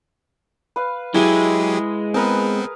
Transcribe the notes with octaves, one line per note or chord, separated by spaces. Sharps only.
B4 F5
F#3 G#3 E4 G4 G#4 G#5
B3 C4 G#4 A#4 B4